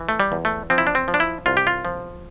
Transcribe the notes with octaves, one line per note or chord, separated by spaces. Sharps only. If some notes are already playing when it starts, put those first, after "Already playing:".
Already playing: E3
A3
G3
E2
A3
F3 C4
E4
D4
C4
F3
D4
E4
C2 F4
G4
F4
F3